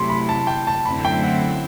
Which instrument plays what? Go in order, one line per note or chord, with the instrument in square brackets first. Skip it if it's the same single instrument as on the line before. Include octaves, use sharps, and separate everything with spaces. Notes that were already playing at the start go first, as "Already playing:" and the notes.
Already playing: [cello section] C3 F#3 A3 E4 [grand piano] C6
[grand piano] B5
A5
G5
A5
[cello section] F#2 D3 A3 C4 E4 [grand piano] B5
[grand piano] G5
F#5